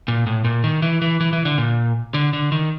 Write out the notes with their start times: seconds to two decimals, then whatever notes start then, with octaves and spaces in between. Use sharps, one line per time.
0.08 A#2
0.27 A2
0.44 A#2
0.64 D#3
0.82 E3
1.02 E3
1.20 E3
1.33 E3
1.45 D3
1.58 A#2
2.14 D3
2.33 D3
2.52 D#3